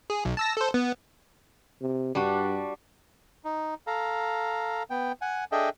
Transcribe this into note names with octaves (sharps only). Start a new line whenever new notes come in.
G#4
B1
A5 E6 A#6
A4 C5
B3
C3
G2 G3 D4 F#4
D#4
A4 F5 A#5
B3 G5
F#5 G#5
D4 G#4 A4 D#5 E5 G5